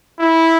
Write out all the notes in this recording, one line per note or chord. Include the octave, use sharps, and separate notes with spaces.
E4